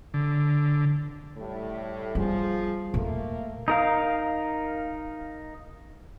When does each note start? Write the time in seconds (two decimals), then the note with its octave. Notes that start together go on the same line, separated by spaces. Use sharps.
0.14 D3
1.37 A2 G3
2.15 F3 G3 B3 G#4
2.94 D#2 A#2 A3 A#3
3.68 D#4 A#4 F5